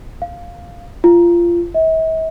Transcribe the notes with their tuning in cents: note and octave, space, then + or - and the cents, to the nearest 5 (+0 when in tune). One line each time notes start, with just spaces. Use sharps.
F5 +5
F4 -20
E5 -45